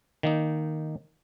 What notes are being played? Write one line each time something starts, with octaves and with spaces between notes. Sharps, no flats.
D#3 A#3 D#4